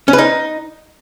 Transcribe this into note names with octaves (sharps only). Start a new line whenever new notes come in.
C#4
B4
D#4